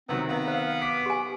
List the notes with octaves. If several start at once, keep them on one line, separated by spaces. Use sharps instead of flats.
C3 D#3 F#3 B3 C4
B3 F5
C5 F5
D6 B6
G4 G#5